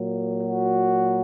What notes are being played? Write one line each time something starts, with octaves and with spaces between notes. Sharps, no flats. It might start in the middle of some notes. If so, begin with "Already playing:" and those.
Already playing: A#2 F#3 A#3
F#4